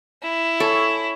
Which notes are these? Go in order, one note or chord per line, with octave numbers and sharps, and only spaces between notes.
E4
A4 C#5 G#5